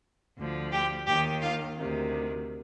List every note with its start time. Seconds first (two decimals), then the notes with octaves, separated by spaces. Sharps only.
0.38 D2 D3 F3
0.72 G4 G5
1.06 D#2 D#3 G4 G5
1.41 F4 F5
1.76 D2 C3 D#3